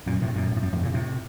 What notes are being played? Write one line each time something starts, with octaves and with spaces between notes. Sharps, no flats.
F#2 A#2
A2 C3
F#2 A#2
F#2
A2
F#2
F2 A2
A#2 C#3
A2 C3